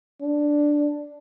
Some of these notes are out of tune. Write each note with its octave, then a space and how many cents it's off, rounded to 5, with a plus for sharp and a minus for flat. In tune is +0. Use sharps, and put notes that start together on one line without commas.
D4 +0